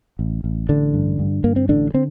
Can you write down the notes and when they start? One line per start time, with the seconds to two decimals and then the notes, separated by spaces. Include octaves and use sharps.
0.19 A1
0.44 A1
0.69 A1 D3 D4
0.94 G2
1.19 G2
1.44 G2 A#3
1.56 C4
1.69 A1 D3 D4
1.94 D3 C4